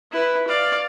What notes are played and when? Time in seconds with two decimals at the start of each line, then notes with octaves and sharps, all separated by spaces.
0.12 E4 B4
0.47 D5 F5